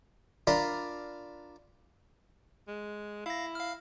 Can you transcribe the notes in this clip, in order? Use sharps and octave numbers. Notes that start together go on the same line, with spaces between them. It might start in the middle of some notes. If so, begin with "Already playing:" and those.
D4 F4 A#4 D5 B5 C6
G#3
E4 F5 A#6
F5 F6